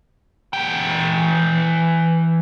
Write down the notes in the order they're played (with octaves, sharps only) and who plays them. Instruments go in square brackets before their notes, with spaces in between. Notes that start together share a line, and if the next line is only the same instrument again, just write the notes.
[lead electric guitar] E3 G5